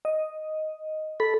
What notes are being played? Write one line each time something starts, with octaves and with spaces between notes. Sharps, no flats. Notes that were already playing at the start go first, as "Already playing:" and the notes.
D#5
A4 B5